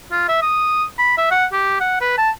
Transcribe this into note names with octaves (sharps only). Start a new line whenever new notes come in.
F4
E5
D#6
B5
E5
F#5
G4
F#5
B4
A5